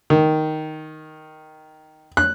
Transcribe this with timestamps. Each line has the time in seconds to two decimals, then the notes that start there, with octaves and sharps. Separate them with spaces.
0.10 D#3
2.17 F#6